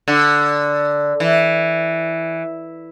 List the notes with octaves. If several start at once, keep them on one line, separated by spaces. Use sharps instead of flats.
D3
E3